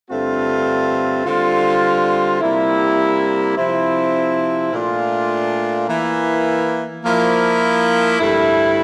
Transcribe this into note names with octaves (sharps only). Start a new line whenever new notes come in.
G2 D3 A3 C4 F4
D3 G3 C4 F4
C3 G3 A#3 E4
C3 F3 C4 E4
A#2 A3 D4 F4
E3 A#3 E4
F3 A#3 E4
G2 D3 A3 E4